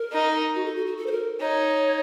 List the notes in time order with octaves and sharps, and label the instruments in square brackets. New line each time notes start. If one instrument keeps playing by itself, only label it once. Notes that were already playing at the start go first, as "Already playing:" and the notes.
Already playing: [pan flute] A#4
[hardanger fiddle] D#4
[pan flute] F#4
A4
F#4
F#4
A4
C5
A#4
[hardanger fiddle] D#4 [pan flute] C#5